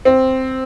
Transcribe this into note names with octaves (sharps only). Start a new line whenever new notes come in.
C4